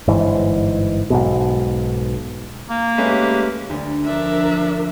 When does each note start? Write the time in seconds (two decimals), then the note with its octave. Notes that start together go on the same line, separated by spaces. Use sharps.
0.08 G1 G#2 E3
1.10 B1 G#2 B2
2.70 A#3
2.98 G#3 A3 C#4 G4 B4
3.70 D2
4.05 F3 D4 A#4 E5